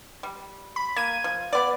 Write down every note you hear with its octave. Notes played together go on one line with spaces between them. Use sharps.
G3
B5
A#3 G#6 D#7
F3
B3 D5 D6